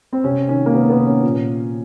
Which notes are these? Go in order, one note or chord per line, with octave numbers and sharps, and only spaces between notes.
C4
C3 C#4
D#3 C#4
A#3
C3 B3
B3
D#3
C#4
A#2